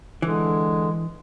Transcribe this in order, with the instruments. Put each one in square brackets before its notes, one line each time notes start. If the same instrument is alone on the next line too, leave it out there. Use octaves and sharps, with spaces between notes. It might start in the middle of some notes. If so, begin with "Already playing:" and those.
[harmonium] D3 [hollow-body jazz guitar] E3 [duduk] G#3